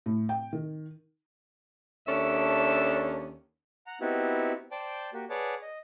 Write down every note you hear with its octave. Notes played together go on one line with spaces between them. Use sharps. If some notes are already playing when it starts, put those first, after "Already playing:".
A2
G5
D#3
D#2 C#4 D4 A4 E5
F#5 A#5
B3 C4 D#4 E4 F#4 G4
C5 D5 G5 A5
A#3 F#4 G4
G#4 B4 C#5 D5 F#5 A5
D#5